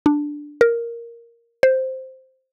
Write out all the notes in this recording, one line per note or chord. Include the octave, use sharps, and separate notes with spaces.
D4
A#4
C5